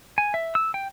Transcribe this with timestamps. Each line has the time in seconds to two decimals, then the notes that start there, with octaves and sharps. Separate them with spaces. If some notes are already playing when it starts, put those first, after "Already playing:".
0.18 G#5
0.34 E5
0.55 E6
0.74 G5